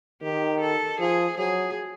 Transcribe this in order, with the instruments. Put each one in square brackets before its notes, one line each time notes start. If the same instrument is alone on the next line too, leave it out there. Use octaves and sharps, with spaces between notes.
[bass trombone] D#3 [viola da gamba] G4
[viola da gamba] A4
[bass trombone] F3 [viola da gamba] G#4
[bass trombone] F#3 [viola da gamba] G#4